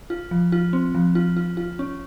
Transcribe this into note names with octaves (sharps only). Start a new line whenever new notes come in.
F4
F3
F4
C4
F3
F4
F4
F4
C#4